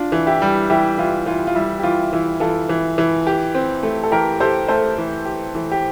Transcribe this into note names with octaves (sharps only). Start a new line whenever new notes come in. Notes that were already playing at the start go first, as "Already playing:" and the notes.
Already playing: D4 F4
E3
E4 G4
G3
E3 E4 G4
E3 F4
E3 F4
F4
G3 E4
G4
E3 F4
E3 E4
E3 F4 A4
E3
E3
G4
C4
A3
A4
E3 G4 A#4
G4 A4 C5
A3 A4 C5
E3
G4
E3
G4